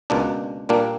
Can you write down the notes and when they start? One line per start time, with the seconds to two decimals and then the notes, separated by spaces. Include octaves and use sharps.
0.10 C#2 B2 A#3 D4
0.69 A#2 G3 A#3 D4